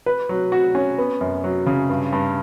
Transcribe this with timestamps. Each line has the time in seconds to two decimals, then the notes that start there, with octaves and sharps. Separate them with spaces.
0.06 B4
0.29 F#3
0.52 F#4
0.75 C#4
0.98 B3
1.21 F#2
1.44 F#3
1.66 C#3
1.89 G2
2.12 G2